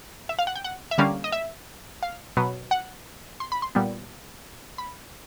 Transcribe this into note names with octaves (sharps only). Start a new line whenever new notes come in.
E5
F5
F#5
G5
F#5
E5
D3 G3 A#3 C#4 F5
D#5
E5
F5
B2 F#3 B3
F#5
C6
B5
C6
A#2 G3 B3
B5